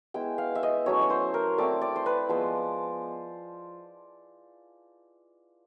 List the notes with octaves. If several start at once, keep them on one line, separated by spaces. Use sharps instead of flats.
G#3 B3 E4 G5
F5
E5
D#5
F#3 A3 C#4 E4 C#5
C#5
C5
A#4
A3 C4 E4 D5
D5
C5
B4
F3 G#3 B3 C5